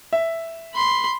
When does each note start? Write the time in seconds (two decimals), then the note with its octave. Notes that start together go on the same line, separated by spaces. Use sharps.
0.13 E5
0.74 B5 C6